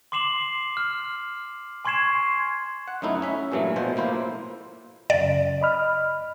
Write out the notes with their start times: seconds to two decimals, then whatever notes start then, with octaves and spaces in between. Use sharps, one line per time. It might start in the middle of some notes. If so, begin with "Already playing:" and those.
0.12 C6 D6 C7 E7 F#7
0.77 F6
1.85 G#5 C6 C#6 G#6 C7 E7
2.88 F#5
3.02 F#2 A3 D#4 E4
3.22 C#4 E5
3.52 G2 A#2 E3 F#3 A3
3.76 B2 F3 C5
3.96 A2 A#3 E4 C5
5.10 F#2 C#3 D5
5.61 D#5 B5 F6